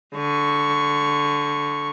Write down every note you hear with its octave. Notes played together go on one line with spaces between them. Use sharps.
D3 C#6